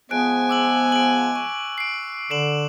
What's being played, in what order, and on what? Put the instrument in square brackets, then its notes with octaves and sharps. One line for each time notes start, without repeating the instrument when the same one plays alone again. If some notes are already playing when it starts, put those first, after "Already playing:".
[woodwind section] F3 G#3 B3 [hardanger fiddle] G#5 [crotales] F#6 D7
[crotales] D6 E6 F#7
D7 F#7
C#6
C7 D7
[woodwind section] D3 [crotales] C7 E7 F#7